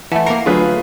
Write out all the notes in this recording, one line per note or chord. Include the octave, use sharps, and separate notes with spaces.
E3 A3 E5 F#5 A5
A#3 A#4 C7
D3 F#3 A3 F4 G#4 B4